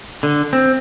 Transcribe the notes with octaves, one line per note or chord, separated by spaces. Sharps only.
D3
C4